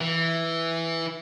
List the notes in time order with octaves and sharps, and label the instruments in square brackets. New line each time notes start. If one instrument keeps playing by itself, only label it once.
[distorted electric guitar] E3